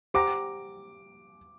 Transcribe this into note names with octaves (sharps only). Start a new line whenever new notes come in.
G4 C5 F#5 A#5 D6